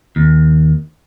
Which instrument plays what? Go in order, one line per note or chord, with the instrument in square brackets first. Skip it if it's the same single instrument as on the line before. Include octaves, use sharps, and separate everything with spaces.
[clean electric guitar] D#2